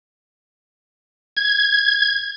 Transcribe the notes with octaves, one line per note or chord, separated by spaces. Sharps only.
G#6